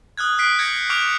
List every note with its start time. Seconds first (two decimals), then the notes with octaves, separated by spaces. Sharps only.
0.17 D#6 F6 F#6 G#6
0.38 D#6 F6 F#6 B6 C7 D7
0.59 G6 G#6 A#6 C#7
0.90 C#6 D6 F6 G6 D7 F7